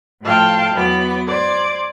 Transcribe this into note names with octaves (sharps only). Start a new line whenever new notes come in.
A2 F3 A4 F5 G5 A5
E2 F#3 B3 D6
C5 D5 D6 G#6